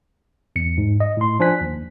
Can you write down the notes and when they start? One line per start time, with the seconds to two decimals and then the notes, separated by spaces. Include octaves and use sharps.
0.56 E2 C#7
0.78 G#2
1.00 D#5
1.17 A2 C6
1.40 F3 D4 C5 G#5 F#6 B6
1.61 D#2